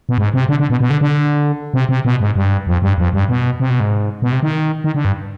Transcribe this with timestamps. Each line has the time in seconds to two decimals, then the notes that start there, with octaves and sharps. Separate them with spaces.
0.09 B2
0.18 G#2
0.34 C3
0.49 D3
0.60 D3
0.70 B2
0.80 B2
0.90 D3
1.01 D3
1.74 C3
1.89 C3
2.05 B2
2.20 G#2
2.36 G2
2.67 F2
2.82 G2
2.98 F2
3.13 G2
3.29 B2
3.60 C3
3.70 B2
3.80 G#2
4.22 B2
4.32 C3
4.43 D#3
4.84 D#3
4.95 D3
5.05 G2